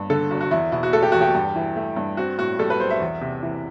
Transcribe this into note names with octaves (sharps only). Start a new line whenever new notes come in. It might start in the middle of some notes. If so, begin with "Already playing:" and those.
Already playing: G1 G2
D3 A4
G1 F#4
F#4
E2 E4
B2 E4
F#4
A3 A4
G4
E2 F#4
G4
G2
E3
A3
G2
C4 F#4
A2 F#4
G3 A4
B4
B1 C5
E5
E2
C3
E3